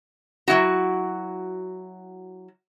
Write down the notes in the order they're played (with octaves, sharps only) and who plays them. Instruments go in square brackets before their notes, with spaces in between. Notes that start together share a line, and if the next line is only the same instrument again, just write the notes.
[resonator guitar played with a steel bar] F#3 C#4 E4 F#4